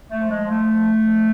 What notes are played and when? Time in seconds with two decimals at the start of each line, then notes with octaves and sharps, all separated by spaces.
0.10 A3
0.17 F3
0.30 G#3
0.43 F3
0.50 A3
0.71 F3
0.98 F3